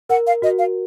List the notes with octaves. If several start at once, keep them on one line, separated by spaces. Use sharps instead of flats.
A#4 F#5
F5
F#4 D#5
F5